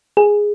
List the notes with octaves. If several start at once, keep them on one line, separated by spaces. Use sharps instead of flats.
G#4